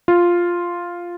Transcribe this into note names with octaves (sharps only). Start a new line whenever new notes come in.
F4